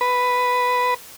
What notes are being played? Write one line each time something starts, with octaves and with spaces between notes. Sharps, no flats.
B4